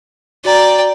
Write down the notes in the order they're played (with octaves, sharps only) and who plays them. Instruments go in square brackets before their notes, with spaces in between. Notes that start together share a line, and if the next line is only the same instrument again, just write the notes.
[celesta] F#4 A#5 [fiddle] D5 G5